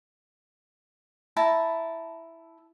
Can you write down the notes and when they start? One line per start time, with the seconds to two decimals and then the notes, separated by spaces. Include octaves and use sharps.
1.37 E4 A5 A#5